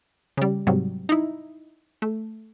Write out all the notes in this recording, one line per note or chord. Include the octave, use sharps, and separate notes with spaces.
C#3 G3
G#2 C3 F#3 G3
D#4 E4
A3